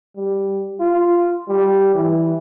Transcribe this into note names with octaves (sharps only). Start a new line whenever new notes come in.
G3
F4
G3
E3